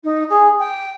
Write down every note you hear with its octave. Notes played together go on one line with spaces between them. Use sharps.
D#4
G#4
G5